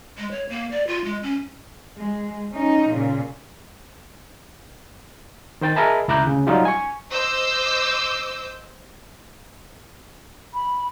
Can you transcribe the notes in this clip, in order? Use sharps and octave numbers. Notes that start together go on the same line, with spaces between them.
G#3
C#5
A#3
D5
F4
G#3
C#4
G#3
C#4 D#4
A#2 C#3
D#3 C5 G5 A6
G#4 A#4 D#5 E5 A5 B5
C#2 E4 A#5 D6 F#6 G6
D2 C#3
F#3 G3 D#4 F4 G4
G#5 C#6
C5 D#5 D6 E6 G6
B5